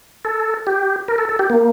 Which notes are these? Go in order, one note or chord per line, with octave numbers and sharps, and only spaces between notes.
A4
G4
A#4
A4
A4
G4
A#3